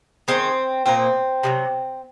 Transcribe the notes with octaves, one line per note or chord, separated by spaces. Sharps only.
D#3 G#3 C4
A#2 F3 A#3 C4
C3 D#3 F#3